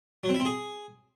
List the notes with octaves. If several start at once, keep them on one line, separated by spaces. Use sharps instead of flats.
F#3
C4
E4
C4
G#4